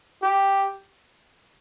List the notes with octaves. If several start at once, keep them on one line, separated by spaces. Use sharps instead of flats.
G4